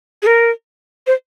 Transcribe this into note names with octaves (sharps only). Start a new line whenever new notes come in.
G#4
A#4
C5